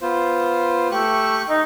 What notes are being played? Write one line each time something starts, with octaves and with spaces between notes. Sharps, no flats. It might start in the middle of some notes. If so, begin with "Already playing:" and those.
B3 F4 C5
A3 G4 C#6 F#6
D#4